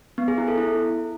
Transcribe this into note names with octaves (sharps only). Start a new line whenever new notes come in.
B3
G#4
E4
A4
E4